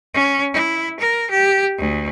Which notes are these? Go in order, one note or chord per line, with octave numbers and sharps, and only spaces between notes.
C#4
E4
A#4
G4
D2